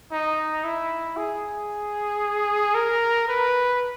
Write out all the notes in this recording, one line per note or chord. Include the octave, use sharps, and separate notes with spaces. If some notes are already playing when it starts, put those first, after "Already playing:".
D#4
E4
G#4
A#4
B4